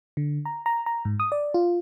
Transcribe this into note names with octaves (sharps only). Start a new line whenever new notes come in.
D3
A#5
A#5
A#5
G#2
D#6
D5
F4